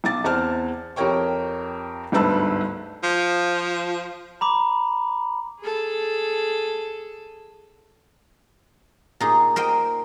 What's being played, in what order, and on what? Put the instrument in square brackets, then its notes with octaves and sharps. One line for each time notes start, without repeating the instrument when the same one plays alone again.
[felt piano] B1 D6 A6
E2 C4 A5 F6
F2 G4 A#4 C#5 G5 C#6
G1 D2 G#2 B4 A5 E6
[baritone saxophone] F3
[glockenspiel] A#5 B5 D6
[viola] G#4 A4
[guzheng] A#2 D#4 G#4
A#4 C5 D#5 G5